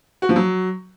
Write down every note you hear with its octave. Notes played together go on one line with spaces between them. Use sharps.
F#4
F3
F#3